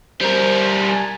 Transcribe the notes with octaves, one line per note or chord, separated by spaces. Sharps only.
G3 A#4 C5
G#5 A5